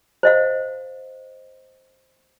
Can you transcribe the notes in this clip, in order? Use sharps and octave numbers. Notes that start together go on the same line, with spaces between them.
C5 D#5 F5